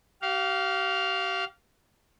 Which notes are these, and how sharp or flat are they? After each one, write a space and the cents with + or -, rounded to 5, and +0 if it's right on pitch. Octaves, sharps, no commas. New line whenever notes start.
G4 -40 F5 +0